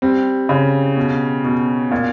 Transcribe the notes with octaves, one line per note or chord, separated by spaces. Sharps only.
G3 C4
C#3
B2
B2
A#2